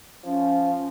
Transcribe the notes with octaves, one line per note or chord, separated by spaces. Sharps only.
F3 C#4